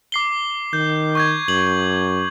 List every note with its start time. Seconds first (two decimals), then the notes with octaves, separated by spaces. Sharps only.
0.12 D6 C7 G7
0.73 D#3 G6
1.15 C#6 G6 G#6
1.48 F#2 F#7